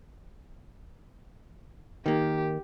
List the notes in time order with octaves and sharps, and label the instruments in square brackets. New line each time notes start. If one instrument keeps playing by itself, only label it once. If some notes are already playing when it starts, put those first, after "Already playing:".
[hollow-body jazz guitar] D#3 A#3 [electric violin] G4